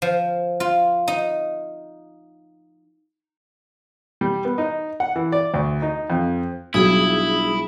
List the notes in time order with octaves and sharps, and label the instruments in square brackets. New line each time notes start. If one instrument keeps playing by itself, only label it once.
[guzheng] F3
F4
D#4
[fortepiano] G3
B3
D#4
F#5
E3
D5
D2
D#4
F2
[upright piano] B1 [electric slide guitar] G3 D4 F4 [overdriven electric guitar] E4 [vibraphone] G#4 D#6